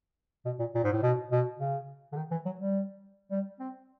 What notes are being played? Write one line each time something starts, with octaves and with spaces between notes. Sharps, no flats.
B2
A#2
A#2
G#2
A2
B2
B2
C#3
D3
D#3
E3
F#3
G3
G3
C4